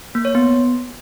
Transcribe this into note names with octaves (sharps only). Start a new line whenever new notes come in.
A#3
C#5
B3